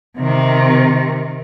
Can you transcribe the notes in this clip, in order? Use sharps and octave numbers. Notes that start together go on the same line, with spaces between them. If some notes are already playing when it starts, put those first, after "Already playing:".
C3 D#3